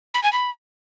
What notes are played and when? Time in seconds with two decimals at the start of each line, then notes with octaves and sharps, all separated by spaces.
0.14 B5
0.23 G#5
0.33 B5